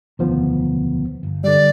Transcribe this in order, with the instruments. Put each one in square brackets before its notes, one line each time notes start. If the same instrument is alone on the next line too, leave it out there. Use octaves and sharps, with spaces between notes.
[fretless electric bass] E1 D2 [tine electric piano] D#3 F3 B3
[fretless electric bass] G1
[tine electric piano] D3 G3 [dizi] D5